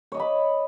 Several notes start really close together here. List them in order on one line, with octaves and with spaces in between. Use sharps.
C#5 D#5 D6 B5